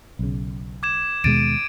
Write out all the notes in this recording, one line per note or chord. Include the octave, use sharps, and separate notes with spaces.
B1 C#3
D6 G#6 E7
D#2 B2 G#3 A6 D7 D#7